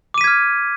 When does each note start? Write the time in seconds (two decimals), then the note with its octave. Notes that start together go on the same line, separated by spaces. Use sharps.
0.14 D6
0.18 D#7
0.21 B6
0.24 G#6
0.27 F6